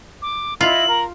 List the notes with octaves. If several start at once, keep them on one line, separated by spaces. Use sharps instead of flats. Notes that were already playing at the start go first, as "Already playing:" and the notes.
D6
E4 F4 D#5 F#7
A#4